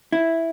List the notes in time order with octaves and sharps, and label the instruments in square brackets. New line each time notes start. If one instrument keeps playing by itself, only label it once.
[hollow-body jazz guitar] E4